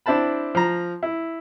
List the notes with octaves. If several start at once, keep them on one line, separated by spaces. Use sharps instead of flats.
C4 D4 E4 C5 A5 B5
F3 A#5
E4